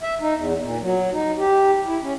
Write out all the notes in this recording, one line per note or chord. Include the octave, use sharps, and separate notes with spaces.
E5
D#4
E2
A#2
F#3
D#4
G4
E4
C#4